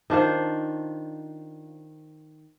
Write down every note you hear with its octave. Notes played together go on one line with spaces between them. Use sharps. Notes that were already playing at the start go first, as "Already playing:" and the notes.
D#3 D4 F4 C5